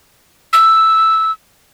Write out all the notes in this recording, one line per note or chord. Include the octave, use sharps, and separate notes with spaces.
E6